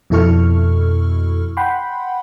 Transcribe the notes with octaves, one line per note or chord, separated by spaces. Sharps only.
F2 B2 E4 A4 C#6 F6
F#5 G5 B5 C6